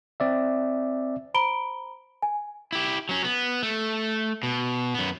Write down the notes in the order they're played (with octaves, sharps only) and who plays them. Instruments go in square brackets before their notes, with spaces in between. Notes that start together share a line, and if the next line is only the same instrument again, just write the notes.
[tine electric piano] C4 D5 E5
[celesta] C5 A#5 B5 D7 G7
G#5
[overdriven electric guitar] E4 G4
F#3 C#4
B3
A3
B2
F#2 B3